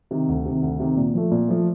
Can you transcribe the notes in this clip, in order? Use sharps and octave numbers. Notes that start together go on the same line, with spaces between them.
C3 D#3
D2
C3 D#3
D2
C3 D#3
A#2
F3 A3
A#2
F3 A3